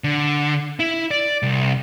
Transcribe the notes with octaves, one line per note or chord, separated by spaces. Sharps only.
D3
E4
D5
C2